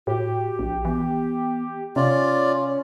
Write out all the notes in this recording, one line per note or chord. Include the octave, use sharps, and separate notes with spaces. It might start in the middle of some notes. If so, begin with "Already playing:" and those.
A2 F#4 G4
A#1
E3 B3
C3 C#4 F4 C#5 D5